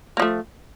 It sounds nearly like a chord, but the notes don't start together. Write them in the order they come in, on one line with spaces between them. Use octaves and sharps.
A#3 F3 A3